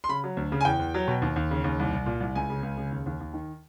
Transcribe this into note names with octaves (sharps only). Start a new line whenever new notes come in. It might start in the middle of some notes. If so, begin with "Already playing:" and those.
C6
C#3 B5
F#3
D2
C#3
G#5
E2 G5
E2
F#3
B2
D#2
D#2
C#3
D#2
C2
C2
A#2
C2
C#2 G#5
C#3
C#2
C#3
D#2
D#2
D#2
D#3